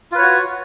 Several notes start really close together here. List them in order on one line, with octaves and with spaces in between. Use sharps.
F4 B4 C#5 F#4